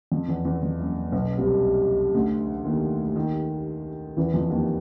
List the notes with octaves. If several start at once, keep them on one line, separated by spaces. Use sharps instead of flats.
F2
E2
E2
F2
F#1 F#2
B1 B2
C2 C3
D2 D3
D#2 D#3
D#2 D#3
E2 E3
F2 F3
D#2 D#3